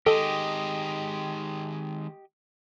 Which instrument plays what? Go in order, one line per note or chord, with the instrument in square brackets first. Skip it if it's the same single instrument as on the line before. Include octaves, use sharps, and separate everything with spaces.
[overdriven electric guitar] D#3 G#3 [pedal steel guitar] G4 D#5 [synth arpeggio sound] A4